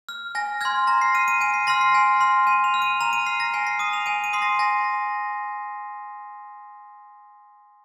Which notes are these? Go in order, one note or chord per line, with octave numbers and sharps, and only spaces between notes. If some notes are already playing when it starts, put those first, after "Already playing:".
F6
G#5 A#6
C6 F6 G#6
A#5 A#6
C7
F6 D#7
D#7
G#5 D#7
C7
C6 F6 A#6
C7
G#5
C6 F6
G#5 D#7
F7
F6
D#7
A#5 F7
D#7
F6 C7
A#6
G#5 C7
C7
D#6 D#7
F7
G#5 D#7
D#7
C6 D#6 C7
A#6
G#5 A#6